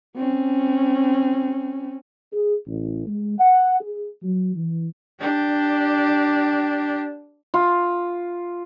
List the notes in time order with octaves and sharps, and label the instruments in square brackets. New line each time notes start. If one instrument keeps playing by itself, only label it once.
[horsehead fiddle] C4 C#4
[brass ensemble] G#4
A1
G#3
F#5
G#4
F#3
E3
[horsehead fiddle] D4 G4
[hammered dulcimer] F4